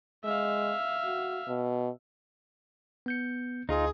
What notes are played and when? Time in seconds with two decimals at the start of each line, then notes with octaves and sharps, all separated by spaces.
0.24 G#3 E5 F5
1.05 F#4
1.48 B2
3.06 B3 G6 C#7
3.69 D2 D#4 F4 G#4